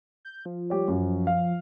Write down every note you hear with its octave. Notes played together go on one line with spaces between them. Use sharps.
G6
F3
G3 G4 C#5
F#2 F#4
F5